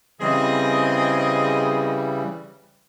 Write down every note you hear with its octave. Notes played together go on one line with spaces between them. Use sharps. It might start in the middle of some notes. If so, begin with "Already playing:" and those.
C#3 E3 G3 C4 G#4 D#5